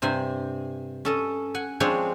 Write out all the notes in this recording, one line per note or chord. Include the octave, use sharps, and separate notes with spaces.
G2 C3 C5 G#5
C#4 A4 D#5
F#5 G#5
F3 G#3 C4 D4 G#4 C#5